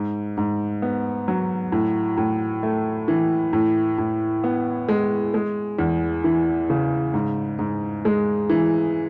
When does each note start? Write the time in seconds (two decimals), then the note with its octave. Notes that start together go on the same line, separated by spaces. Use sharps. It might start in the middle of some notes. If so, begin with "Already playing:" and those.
Already playing: G#2
0.37 G#2
0.82 B3
1.28 F#3
1.72 A2
2.17 A2
2.63 A3
3.08 E3
3.53 A2
3.98 A2
4.44 B3
4.89 G#3
5.34 G#3
5.79 E2
6.24 E3
6.70 C#3
7.14 G#2
7.59 G#2
8.05 G#3
8.50 E3